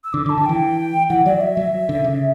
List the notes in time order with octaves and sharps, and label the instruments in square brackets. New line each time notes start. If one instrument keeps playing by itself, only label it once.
[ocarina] E6
[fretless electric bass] D3 [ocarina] D6
[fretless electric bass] D3
[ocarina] A5
[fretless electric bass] D3
[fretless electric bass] E3 [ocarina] G5
[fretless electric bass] E3 [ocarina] F#5
[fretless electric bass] F#3 [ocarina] D5
[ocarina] E5
[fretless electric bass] F#3
D3
C#3